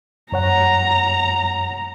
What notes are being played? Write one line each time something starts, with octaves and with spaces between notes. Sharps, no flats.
F#2 C#5 F#5 A#5